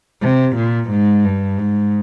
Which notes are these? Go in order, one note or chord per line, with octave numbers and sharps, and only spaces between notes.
C3
A#2
G#2
G2
G#2